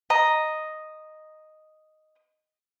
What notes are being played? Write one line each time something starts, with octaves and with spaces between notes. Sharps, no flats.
D#5 A#5